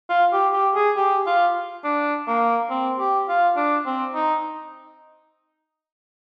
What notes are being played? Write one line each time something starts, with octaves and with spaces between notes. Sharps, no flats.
F4
G4
G4
G#4
G4
F4
D4
A#3
C4
G4
F4
D4
C4
D#4